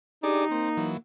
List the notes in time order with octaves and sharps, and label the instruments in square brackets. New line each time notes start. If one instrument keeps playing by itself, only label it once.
[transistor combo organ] D4 G#4 D5 [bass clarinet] D#4 [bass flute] G4
[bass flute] A#3 [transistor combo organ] C4
[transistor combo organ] E3 F#3